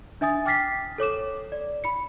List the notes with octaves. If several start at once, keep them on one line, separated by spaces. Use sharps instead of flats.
D4 E5 G#5 D#6 A6
G5 D6 F6 A6 B6 C7
A4 C#5 D6 E7
D5
B5 C#7